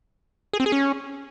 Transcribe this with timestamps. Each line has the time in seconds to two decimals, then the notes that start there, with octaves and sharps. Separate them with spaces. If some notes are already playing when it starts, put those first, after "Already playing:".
0.53 G#4
0.60 C4
0.66 G#4
0.72 C#4